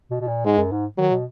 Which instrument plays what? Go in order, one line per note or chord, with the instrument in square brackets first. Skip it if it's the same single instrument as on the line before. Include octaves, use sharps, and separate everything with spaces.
[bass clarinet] B2
B2
A#2
[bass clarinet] G#2 [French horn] G#3
[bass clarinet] F#2
G#2
[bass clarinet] D#3 [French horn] F#3
[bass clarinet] B2